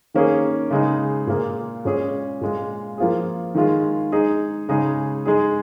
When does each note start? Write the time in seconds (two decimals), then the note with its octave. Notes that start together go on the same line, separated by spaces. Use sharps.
0.14 D#3 A#3 C#4 G#4
0.71 C#3 G#3 D#4
1.27 A#2 A#3 F4 G#4
1.85 A#2 G#3 C#4 G#4
2.41 A#2 G#3 F4
2.98 F3 A#3 F4 G#4
3.55 D#3 G#3 F4 G#4
4.12 G#3 D#4 G#4
4.69 C#3 G#3 D#4 G#4
5.26 G#3 D#4 G#4